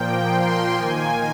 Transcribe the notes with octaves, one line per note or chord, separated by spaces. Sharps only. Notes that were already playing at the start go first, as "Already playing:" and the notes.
Already playing: A#2 F3 A#3 G5
C6
D#3 A#3 G#5